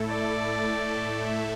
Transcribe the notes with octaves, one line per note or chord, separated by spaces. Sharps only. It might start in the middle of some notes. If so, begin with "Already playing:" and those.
Already playing: A2 A3 E4 A4
D5
E5